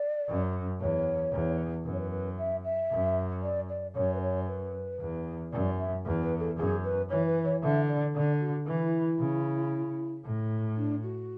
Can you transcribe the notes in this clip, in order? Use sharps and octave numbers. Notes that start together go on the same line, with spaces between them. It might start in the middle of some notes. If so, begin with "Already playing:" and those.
Already playing: D5
F#2
E2 C#5
E2
F#2 B4
C#5
B4
B4
E5
E5
F#2
D5
D5
F#2 C#5
B4
C#5
B4
E2
F#2 D5
E5
E2
B4
A4
F#2 G#4
B4
E3 C#5
B4
C#5
D3 E5
D5
D3 D5
F#4
E3 E4
C#3
A2
D4
F#4